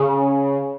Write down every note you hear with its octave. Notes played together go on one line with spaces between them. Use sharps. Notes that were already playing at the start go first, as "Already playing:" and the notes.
Already playing: C#3